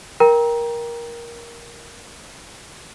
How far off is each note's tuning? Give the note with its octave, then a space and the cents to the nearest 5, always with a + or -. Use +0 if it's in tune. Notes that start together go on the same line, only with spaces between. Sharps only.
A#4 +15 G5 +5 A#5 +20